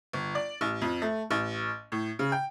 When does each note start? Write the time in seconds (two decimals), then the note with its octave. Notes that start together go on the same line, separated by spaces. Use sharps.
0.13 G1
0.35 D5
0.61 A1
0.82 F2
1.02 A3
1.31 A1
1.92 A2
2.19 C#3
2.32 G5